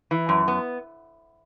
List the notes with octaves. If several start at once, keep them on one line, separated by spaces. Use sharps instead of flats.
E3
F#2
B3